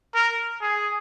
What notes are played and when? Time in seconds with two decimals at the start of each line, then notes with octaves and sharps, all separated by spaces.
0.14 A#4
0.61 G#4